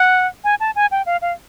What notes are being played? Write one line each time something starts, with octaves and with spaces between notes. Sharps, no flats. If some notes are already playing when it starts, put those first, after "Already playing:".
Already playing: F#5
G#5
A5
G#5
G5
F5
F5